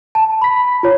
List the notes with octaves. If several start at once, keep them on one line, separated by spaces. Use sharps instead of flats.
A5
B5 B6
F4 C#5